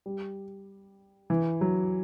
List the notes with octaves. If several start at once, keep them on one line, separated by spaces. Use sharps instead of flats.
G3
E3
F#3